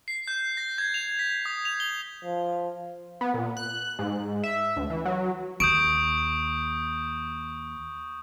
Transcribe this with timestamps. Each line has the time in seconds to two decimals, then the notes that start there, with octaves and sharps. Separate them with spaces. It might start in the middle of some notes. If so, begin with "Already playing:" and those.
0.08 C7
0.28 G6
0.57 A#6
0.78 G#6
0.94 F7
1.19 B6
1.45 D#6
1.65 F7
1.80 G7
2.24 F3
3.21 B3
3.34 A#2
3.57 F#6
3.99 G#2
4.43 E5
4.76 D2
4.90 E3
5.05 F#3
5.60 D#2 C#6 D#6 G6 D7